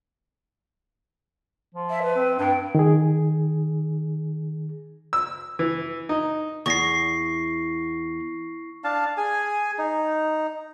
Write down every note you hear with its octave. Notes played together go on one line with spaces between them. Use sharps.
F3
E5
B4
C4
G2 G5
D#3 G#4
E6
E3
D#4
E2 C#6 A#6 C7
D4 F5 A5
G#4 G#5
D#4